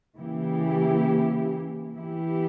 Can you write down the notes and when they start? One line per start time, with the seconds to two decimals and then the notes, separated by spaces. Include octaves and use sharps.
0.17 C#3 E3 A#3 E4 G4
1.95 E3 B3 E4 G4